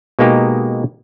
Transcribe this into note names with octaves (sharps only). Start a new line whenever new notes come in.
B2 G#3 A#3 D#4 G4